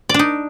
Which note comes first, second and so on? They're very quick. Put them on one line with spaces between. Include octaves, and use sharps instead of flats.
D5 D4 D#4